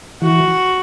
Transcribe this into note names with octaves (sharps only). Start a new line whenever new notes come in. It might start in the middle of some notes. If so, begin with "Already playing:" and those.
E3 F#4